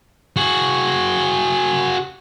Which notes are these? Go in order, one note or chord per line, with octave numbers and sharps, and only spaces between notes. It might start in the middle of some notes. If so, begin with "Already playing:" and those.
F#4 G#4